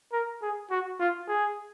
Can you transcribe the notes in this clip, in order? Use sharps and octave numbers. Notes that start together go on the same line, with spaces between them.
A#4
G#4
F#4
F4
G#4